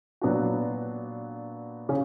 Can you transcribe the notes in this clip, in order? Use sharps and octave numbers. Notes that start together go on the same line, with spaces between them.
A#2 F#3 B3 D4 F#4
C#3 C#4